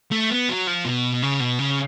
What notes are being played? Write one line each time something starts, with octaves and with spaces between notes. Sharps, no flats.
A3
B3
F#3
F3
B2
C#3
B2
C#3